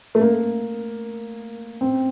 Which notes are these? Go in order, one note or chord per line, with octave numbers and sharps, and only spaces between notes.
A3
A#3
C4